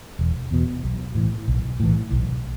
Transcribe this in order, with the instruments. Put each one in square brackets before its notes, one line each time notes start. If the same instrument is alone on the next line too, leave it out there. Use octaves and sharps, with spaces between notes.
[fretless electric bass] E1
E2 B2
B1
A2 E3
B1
A2 E3
B1